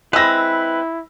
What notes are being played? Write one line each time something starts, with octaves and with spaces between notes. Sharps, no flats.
G#3 C4 E4 B4 B5 E6 A#6